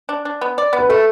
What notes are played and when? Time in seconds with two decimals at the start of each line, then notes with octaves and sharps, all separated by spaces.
0.09 D4
0.25 D4
0.41 B3
0.58 D5
0.73 B3
0.79 B4
0.89 A3 A4